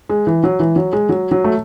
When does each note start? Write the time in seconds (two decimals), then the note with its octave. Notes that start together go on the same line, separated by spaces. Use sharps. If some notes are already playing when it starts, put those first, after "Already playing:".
0.09 G#3
0.27 E3
0.44 F#3
0.59 E3
0.76 F#3
0.93 G#3
1.09 F#3
1.31 F#3
1.44 A3